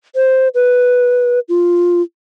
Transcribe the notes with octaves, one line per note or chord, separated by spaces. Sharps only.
C5
B4
F4